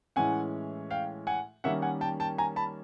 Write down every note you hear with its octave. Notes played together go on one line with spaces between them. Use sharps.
A2 E3 G#3 C#4 F#5 G#5
F5 G5
F#5 G#5
D#3 G3 A#3 C#4 E5 F#5
F#5 G#5
G5 A5
G5 A5
G#5 A#5
A5 B5